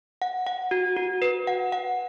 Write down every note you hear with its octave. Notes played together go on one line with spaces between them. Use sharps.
F#5
F#5
F#4
F#4
B4
F#5
F#5